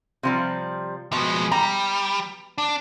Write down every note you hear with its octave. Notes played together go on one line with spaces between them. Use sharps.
C3 F3 G3
B2 F3 G#3
G3 A#5
D4